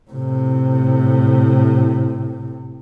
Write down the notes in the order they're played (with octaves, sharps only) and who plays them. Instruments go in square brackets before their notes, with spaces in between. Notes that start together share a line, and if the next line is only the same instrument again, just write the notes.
[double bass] A2 C3